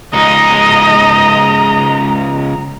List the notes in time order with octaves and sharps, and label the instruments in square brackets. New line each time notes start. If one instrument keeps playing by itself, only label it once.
[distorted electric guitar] C#2 D#4 [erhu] D#5 [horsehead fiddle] A#5